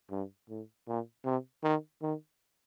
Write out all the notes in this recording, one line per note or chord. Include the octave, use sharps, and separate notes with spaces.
G2
A2
A#2
C3
D#3
D#3